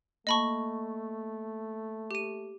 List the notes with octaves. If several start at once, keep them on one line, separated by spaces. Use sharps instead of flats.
A3 A#3 D#5 A5 B5 C#6
G4 D#7